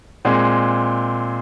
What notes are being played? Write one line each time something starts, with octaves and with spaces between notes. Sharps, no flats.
A#2 G#3 C4